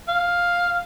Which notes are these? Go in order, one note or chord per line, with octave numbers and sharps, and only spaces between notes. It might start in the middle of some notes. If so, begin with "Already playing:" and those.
F5